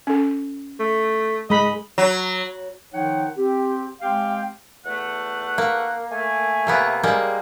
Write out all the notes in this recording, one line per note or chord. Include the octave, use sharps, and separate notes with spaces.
C#4 A4
A3
G#3 D#5 B5
F#3
D#3 F3 D#4 C#5 F#5 G5
C4 G4
G#3 C4 G4 F5 G5
E2 A3 F#5
A#3
A3 G#5
C3 A#3 B3
G3 G#3 A#3